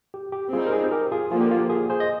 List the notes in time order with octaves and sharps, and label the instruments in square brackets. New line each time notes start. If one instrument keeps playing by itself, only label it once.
[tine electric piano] G4
G4
[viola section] G3 C4 D#4 [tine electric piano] F4 G#4
[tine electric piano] A#4
G#4 C5
G4 A#4
F4 G#4
[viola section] D3 F3 A#3 [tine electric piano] F4
[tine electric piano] G4
F4
G4
F4 G#4
G#4 C5
D#5